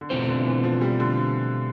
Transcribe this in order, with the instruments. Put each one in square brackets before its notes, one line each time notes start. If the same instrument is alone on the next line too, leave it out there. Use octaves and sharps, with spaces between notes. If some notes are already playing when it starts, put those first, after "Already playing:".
[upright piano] D3
[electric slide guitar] B2 A3 C4 F4 C5 [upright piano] E3
[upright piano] D3
E3
F3
G3
D3